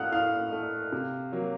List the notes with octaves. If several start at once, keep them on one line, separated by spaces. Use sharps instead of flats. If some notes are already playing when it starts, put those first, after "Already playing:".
Already playing: A2 A3 F5 F#5 D#6 F6 F#6
A2 F5 F6
A3
C3
F#3 A#3